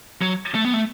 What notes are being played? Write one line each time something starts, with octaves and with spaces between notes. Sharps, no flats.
F#3
A3
B3
A3